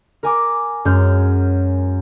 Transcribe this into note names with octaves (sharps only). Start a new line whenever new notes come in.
A#4 G#5 D6
F#2 G#3 C#4 F6 G6